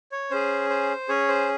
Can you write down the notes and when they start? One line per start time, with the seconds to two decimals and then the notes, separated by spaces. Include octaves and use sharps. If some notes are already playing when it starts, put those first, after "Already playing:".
0.12 C#5
0.30 C#4 G#4 C5
0.70 C5
1.09 C#4 G#4 C#5
1.28 C5